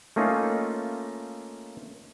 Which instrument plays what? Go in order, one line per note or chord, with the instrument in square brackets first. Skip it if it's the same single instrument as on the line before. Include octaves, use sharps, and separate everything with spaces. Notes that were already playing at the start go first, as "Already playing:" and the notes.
[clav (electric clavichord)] A3 A#3 C#4 D#4 F4